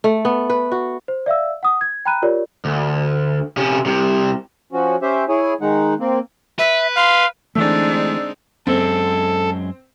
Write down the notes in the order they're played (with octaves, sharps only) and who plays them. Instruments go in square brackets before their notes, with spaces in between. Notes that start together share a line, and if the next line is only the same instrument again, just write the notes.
[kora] A3
B3
B4
F#4
[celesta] C5
D5 E5 F5 E6
F#5 D#6
G#6
G5 A#5 B5 F#6 D#7
F4 G4 A#4 C#5 D5
[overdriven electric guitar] D2
C3 C#4
C2 C3
[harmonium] F3 C#4 F#4
C#4 G4 C5 E5
E4 G#4 C#5 G#5
D#3 G#3 D#4 F#5
A#3 C4
[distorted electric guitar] B4 [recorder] E5
[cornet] F5 [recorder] C6
[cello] D3 D4 [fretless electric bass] E3 A3 [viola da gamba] G#3 C4 D#4 [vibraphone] E6
[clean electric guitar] F#2 G#3 [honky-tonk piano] C4 [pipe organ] A4